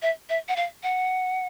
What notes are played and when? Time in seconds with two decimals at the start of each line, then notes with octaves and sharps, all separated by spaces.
0.02 E5
0.29 E5
0.48 F#5
0.56 F5
0.83 F#5